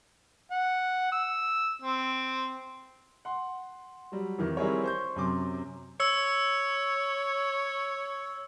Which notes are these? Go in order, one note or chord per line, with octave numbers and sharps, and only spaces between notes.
F#5
E6
C4
F#5 C6
F#3 G3
F2 D#3 E3
G3 C4 E4 G#4 A#4 C#5
C5 C#6 G6
F#2 C3 C6 D6
C#5 E6